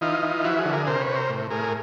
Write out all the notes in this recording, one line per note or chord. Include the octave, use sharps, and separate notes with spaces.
E3 D#4 F4
E3
F3 E4 F#4
F#4 G#4
D3
G#4 A#4
C3 A#4 C5
B4 C#5
C3
A#4 C5
A2
A2 G#4 A#4